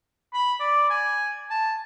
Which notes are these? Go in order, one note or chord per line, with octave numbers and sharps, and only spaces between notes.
B5
D5
G#5
A5